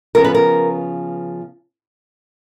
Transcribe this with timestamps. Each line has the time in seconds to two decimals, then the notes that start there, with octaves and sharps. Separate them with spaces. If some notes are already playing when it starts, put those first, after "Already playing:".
0.15 C#3 F3 B3 A#4
0.24 B4
0.34 A#4